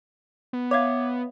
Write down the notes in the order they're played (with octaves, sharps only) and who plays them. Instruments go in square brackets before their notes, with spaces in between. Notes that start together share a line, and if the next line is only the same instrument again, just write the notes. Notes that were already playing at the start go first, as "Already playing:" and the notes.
[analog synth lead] B3
[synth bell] C#5 E5 F5 [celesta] D6 G#6